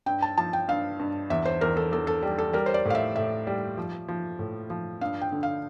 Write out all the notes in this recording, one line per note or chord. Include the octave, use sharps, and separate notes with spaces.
G2 G5
A5
F3 A5
G5
G2 F5
G2
E2 E5
C5
E2 A#4
A4
E2 A4
A4
G3
A4
G3 A#4
C5
D5
A2
F5
E5
A2 E5
G3
F3
F3
A2
F3
G2 F5
G5
D3
F5